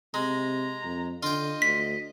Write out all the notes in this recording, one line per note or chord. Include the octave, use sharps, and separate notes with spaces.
C3 G#3 A#5
F2
D3 F4 D#5 G5
D2 B6